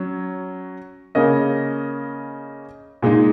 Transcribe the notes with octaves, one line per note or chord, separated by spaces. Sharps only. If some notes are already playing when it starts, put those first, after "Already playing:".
Already playing: F#3 C#4
C#3 A#3 C#4 A#4 D#5
A#2 G#3 D#4